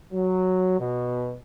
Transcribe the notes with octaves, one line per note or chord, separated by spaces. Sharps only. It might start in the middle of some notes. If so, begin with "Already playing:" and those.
F#3
B2